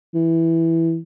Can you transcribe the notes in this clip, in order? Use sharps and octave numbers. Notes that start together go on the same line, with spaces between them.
E3